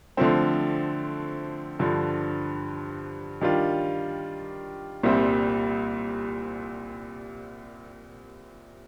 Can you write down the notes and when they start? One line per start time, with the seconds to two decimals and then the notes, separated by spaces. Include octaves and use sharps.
0.17 D3 F3 A3 C4
1.79 G2 D3 F3
3.41 D#3 G3 D4 F4
5.03 C2 A#2 G3 C4